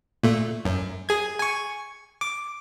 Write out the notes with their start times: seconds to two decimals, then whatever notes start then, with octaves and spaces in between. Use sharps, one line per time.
0.23 A#2 A3
0.65 F#2
1.09 G#4 G#6
1.39 G#5 C#6
2.21 D6